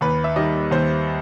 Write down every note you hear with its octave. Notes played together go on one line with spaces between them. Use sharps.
D#2 B4
E5
D#3 G3 D#5
D#2 C5